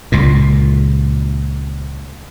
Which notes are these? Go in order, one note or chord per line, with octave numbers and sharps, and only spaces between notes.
C#2 A#2